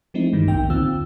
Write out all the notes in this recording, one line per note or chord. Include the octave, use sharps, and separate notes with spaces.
F3 G#3 A3 C4 D#4 E4
G2 D#3 G3
B1 F2 A2 A#3 D#4 G5
D#2 D3 C4 F4 E6